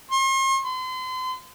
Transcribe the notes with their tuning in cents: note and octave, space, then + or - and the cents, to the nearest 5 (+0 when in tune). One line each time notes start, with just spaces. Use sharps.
C6 +45
C6 -40